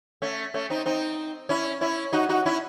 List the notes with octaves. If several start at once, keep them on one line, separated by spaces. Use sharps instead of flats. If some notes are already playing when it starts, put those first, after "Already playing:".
A3 C#4
A3 C#4
C4 D#4
C4 D#4
C#4 E4
C#4 E4
D#4 F#4
D#4 F#4
C#4 E4